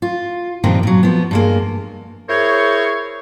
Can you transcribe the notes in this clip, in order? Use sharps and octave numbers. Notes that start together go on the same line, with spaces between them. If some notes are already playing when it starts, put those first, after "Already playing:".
F4
G2 A#2 D#3 F3 C4
A#2 F#3
F3 B3
G2 G#3 A#3
E4 G#4 A#4 C5 C#5